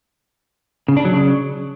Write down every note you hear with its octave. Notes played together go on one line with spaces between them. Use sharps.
C#3
D4
F#3
C#3